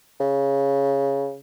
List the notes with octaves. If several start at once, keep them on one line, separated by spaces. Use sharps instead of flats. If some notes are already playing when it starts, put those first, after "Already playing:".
C#3